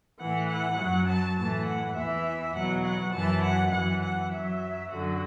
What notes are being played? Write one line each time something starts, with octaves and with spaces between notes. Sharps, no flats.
A2 E3 F#5
F#5
F#2 F#3
A5
A2 E3 A5
F#5
E2 E3 E5
E2 B2 F#3 F#5
F#5
F#2 E3 A5
F#5
F#2 E3 F#5
F#5
F#2 F#3 E5
F#2 D3 F#3 F#4